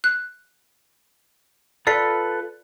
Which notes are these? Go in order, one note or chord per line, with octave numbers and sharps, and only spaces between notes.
F#6
F4 A4 B4 D5 C7